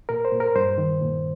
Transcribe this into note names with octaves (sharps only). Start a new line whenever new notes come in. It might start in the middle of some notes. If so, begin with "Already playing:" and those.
A#2 A#4
C5
A#2
A#4
G2 C5
D#3
A#2